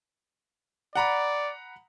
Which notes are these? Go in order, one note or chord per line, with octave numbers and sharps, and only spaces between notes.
D5 F#5 A#5 B5